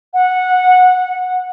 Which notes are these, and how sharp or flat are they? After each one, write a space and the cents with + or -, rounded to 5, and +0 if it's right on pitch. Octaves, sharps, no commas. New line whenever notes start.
F#5 -15